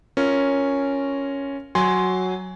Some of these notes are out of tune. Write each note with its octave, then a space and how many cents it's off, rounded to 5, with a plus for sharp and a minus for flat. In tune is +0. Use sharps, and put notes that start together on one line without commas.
C#4 +0 F4 +0 A#4 +0
F#3 +0 G#5 +0 C6 +0